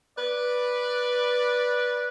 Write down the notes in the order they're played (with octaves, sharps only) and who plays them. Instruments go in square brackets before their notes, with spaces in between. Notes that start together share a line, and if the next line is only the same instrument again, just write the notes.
[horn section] B4 D5